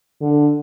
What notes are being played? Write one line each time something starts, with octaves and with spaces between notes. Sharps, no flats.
D3